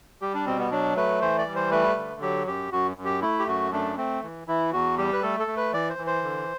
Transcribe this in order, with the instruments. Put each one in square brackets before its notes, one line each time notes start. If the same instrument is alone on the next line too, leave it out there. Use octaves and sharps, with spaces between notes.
[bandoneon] G3 G4
D4
B2 C4
B3
F#3 D4
A3 B4
E3 C5
D5
G3
C5
A3 B4
D3
F#3 G4
F#2 G4
F#2 F#4
F#2
G4
A3 E4
G4
F#2 F#4
A3 D4
A3 C4
E3
E3 E4
E2 F#4
G3 G4
B4
A3 A4
A4
A3
B4
E3 D5
C5
E3
C5
D3